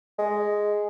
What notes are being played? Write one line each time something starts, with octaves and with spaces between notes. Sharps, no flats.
G#3